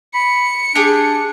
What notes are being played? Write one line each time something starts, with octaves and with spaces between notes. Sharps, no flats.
B5 C#7
D4 G4 G#4